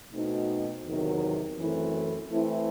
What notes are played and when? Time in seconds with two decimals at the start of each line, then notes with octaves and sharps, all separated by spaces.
0.12 B2 A3 C4 D#4 F#4
0.85 E2 C3 D#3 F#3
1.58 F#2 E3 A3 C4 E4
2.31 E3 A3 C4 E4